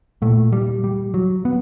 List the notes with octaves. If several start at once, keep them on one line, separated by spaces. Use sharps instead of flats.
A#2 A3
G3
G3
F#3
B3